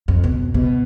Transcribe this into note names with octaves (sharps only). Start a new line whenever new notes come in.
F2
B2
B2